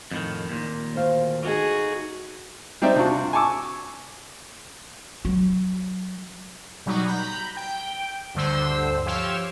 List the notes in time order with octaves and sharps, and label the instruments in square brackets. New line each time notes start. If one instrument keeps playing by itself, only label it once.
[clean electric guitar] F2 A2 D#3
D#2 A#2
[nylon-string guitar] D2 C5 F5
[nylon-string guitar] D#4 A4 [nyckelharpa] F#4 G#4
[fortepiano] G3 C4 D#4 C5 D5 E5
C3 D4 F4 F#4
G#5 A5 C#6 D6 E6
[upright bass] F#3
[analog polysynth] B2 F#3 G3 D#4 F#4
A#5 B5 G6
G5
D2 G2 D3 C5 E6
F3 G4 C#5 F5 E6 E7